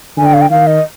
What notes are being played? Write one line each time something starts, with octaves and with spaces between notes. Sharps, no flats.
D3 G#5
G5
F5
G5
D#3 F5
D#5